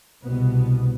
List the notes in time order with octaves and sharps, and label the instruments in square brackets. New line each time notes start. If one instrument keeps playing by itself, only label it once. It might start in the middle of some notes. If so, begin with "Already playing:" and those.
[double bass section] C2 B2 B3